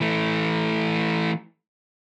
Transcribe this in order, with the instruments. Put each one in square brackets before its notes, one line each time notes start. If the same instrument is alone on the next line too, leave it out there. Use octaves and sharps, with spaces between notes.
[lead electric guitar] E3 A3